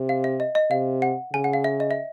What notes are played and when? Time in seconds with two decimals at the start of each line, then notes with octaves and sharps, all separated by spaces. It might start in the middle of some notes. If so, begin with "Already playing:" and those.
Already playing: C3
0.09 F5
0.24 E5
0.40 D#5
0.55 D#5
0.70 C3 F5
1.02 F#5
1.33 C#3 G#5
1.44 F#5
1.54 F5
1.64 E5
1.80 D#5
1.91 E5